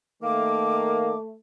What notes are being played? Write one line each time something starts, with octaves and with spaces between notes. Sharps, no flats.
D#3 A3 A#3 D6